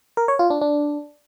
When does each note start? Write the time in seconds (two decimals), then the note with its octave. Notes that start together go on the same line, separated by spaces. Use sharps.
0.17 A#4
0.28 C#5
0.39 F4
0.50 D4
0.61 D4